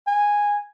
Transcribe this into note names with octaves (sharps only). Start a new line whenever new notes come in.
G#5